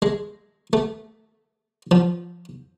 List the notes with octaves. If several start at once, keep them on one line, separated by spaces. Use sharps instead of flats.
G#3
A3
F3